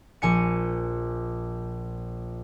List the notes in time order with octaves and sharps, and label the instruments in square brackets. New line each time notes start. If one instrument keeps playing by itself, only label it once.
[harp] A#1 G#5 C#7